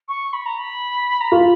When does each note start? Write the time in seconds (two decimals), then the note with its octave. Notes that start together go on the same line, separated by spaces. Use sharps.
0.08 C#6
0.33 B5
0.46 A#5
0.59 B5
1.21 A#5
1.32 F4 B5